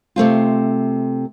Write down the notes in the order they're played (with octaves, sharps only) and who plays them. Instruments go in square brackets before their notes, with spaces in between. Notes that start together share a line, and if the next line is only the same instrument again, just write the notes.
[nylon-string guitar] C3 A3 C4 F4